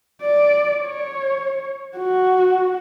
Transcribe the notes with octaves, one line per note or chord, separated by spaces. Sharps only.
D5
C#5
F#4